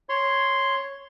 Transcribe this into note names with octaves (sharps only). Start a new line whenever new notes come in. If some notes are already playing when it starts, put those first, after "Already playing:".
C#5 C6